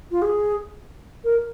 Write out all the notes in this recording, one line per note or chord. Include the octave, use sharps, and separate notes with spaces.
F4
G#4
A#4